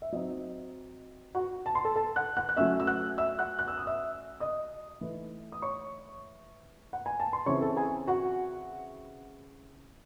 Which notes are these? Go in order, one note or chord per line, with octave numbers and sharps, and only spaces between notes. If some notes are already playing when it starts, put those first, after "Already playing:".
E5
F#3 C4 D#4 D#5
F#4 F#5
A5
C6
A4 A5
A4 A5
F#5 F#6
F#5 F#6
F#6
F#3 A3 C#4 E5 E6
E6
F#5 F#6
E5 E6
F#5 F#6
F#6
E6
D#6
E5 E6
D#5 D#6
E3 A3 D#4
D#6
C#5 C#6
F#5
G#5
A5
C6
C#3 E3 C4 E4 C#5 C#6
A4 A5
G#4 G#5
F#4 F#5